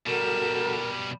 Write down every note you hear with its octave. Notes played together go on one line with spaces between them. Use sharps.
B2 G3 F#4 A4 A#4 E7